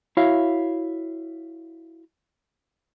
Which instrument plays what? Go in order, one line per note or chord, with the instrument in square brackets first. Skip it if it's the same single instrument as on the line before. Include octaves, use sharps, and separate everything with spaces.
[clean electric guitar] E4 F#4 C#5 E5 F5